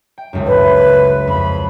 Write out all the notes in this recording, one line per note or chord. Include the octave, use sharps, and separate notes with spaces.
G5
G#1 C#2 F#2
A2 B4
F2 B5